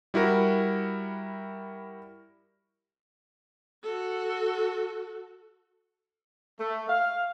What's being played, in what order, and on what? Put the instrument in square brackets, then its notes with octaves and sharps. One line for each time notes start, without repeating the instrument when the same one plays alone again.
[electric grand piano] G3 E4 F#4 A#4
[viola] F#4 A4
[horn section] A3
F5